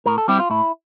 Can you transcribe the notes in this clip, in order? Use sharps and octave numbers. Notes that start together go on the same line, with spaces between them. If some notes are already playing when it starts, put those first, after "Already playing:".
A2 A#4
A4
G3 C4 E4 G4
F4
A2 E4